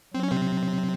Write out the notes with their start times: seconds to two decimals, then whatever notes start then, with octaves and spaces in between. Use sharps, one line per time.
0.14 F#3 C4
0.23 C#4
0.31 C3 C4